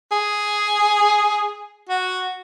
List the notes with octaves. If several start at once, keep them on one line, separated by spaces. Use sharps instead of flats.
G#4
F#4